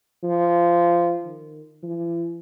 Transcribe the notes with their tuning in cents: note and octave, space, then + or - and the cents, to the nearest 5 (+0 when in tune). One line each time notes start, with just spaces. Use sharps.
F3 -15
D#3 -30
E3 +45